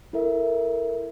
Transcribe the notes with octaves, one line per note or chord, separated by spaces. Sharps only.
E4 A4 A#4 E5